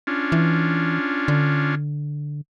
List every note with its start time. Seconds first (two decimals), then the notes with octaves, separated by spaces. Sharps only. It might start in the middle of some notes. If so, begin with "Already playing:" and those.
0.07 C#4 D4 F4
0.32 E3
1.28 D3